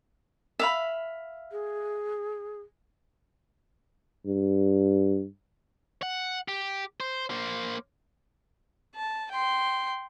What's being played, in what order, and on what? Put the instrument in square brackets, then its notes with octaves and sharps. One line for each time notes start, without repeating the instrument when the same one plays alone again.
[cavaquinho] E5 F5 B5
[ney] G#4
[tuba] G2
[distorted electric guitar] F#5
G4
C5
A#3 C5
[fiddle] A5
G5 C6